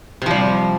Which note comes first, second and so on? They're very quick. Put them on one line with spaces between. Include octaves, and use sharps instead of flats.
C3 F3 G3